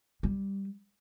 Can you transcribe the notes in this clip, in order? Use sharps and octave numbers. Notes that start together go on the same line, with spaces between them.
G3